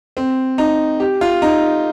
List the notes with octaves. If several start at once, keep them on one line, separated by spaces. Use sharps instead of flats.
C4
D#4
G4
F4
D#4